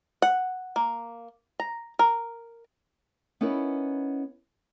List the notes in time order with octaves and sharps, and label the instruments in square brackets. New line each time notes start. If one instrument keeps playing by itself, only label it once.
[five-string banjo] F#5
A#3
A#5
A#4
[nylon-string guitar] B3 C#4 D#4 E4 A#4 B4